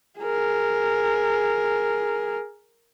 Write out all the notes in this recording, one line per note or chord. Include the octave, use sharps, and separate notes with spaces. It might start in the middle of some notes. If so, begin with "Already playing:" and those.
G#4 A#4